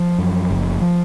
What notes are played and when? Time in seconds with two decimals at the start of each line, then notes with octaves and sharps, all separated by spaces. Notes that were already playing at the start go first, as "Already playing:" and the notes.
Already playing: F3
0.18 F#2
0.51 F#1
0.81 F3